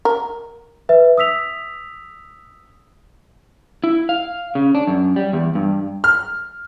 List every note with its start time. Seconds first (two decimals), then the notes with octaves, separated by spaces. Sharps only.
0.05 A#4
0.89 B4 E5
1.18 D#6 E6 B6 F7
3.84 E4
4.09 F5
4.55 C#3
4.75 D4
4.87 F#2
5.16 G3
5.33 E2
5.55 G2
6.04 F6